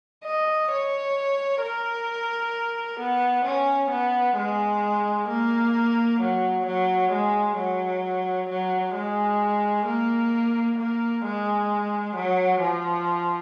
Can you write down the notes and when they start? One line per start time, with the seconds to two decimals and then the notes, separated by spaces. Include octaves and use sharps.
0.25 D#5
0.71 C#5
1.62 A#4
3.00 B3
3.45 C#4
3.91 B3
4.36 G#3
5.28 A#3
6.20 F#3
6.66 F#3
7.12 G#3
7.57 F#3
8.49 F#3
8.95 G#3
9.86 A#3
10.78 A#3
11.24 G#3
12.16 F#3
12.61 F3